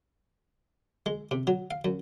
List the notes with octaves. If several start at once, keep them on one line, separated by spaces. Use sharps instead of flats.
G#3
C3
F#3
F5
F#2